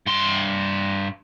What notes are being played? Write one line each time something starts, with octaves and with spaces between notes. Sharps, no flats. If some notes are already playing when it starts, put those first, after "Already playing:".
G2 C6